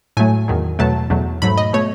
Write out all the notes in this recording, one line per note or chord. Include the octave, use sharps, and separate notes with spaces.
A2 F#3 A3 G#5
E2 D#3 F#3
E2 B2 F#3 A3 A5
E2 B2 F#3 A3
G#2 F#3 A3 B5
D#5
B2 A3 C#5